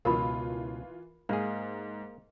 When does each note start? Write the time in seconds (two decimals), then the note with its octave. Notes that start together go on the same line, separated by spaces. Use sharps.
0.05 C#2 B2 E3 F4 A#4 B5
1.29 G#2 A#3 G#4